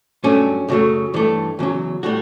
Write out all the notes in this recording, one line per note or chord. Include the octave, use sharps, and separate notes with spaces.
G2 F#3 A3 C#4
F#2 C#3 F#3 A3
G2 E3 A3
E2 C#3 F#3
A2 G3 F#4